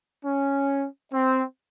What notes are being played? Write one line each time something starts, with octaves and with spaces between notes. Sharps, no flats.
C#4
C4